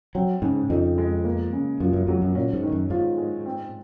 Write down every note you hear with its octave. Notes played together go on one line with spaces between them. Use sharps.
F#3 C4
G#2 C#3
F2 D#4
G#3
A#3
C#3
F#2 F4
F#2
F2 F#3
F#2
A#2 C#4
G#2
D#3
F#2
G#2 F4
G#3
C4